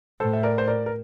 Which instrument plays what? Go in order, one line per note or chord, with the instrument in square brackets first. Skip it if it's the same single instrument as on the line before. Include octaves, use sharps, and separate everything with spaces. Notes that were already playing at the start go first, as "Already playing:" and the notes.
[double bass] A2 [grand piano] A4 C5
[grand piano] E5
A#4 D5
C5
A#4 D5
A#4